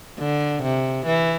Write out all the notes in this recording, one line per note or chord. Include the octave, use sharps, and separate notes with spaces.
D3
C3
E3